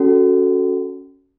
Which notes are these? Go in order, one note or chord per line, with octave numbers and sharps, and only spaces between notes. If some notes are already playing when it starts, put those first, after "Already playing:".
Already playing: C#4 F#4 A4